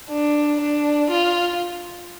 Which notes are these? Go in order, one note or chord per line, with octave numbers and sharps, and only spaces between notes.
D4
D4
F4